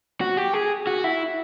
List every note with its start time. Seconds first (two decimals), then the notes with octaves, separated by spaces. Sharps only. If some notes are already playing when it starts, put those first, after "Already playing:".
0.21 F#4
0.37 G4
0.54 G#4
0.87 F#4
1.04 E4